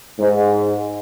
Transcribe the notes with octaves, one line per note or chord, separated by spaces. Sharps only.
G#2